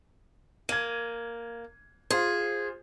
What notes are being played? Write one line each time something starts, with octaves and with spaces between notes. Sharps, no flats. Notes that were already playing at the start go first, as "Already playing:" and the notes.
A#3 G#6 D#7
F4 G#4 C5